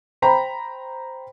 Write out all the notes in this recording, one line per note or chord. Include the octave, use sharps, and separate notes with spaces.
C5 G5 A#5 B5